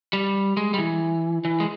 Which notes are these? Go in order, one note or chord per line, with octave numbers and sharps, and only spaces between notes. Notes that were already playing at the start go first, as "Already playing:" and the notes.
G3
G#3
G3
E3
E3
G#3